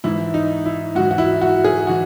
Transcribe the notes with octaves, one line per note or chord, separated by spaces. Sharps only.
G#2 E3 E4
D#4
E4
G#2 E3 F#4
F#4
E4
F#4
G#4
E3 F#4